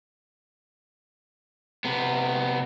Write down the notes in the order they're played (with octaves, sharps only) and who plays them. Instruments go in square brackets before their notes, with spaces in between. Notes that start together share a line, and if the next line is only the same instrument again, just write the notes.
[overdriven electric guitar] C3 B3